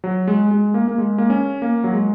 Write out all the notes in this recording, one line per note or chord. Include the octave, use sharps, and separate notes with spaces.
F#3
G#3
G#3
A#3
A#3
G#3
A#3
C#4
A#3
F#3
G#3